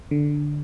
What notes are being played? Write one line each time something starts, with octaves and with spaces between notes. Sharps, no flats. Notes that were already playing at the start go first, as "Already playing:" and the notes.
D3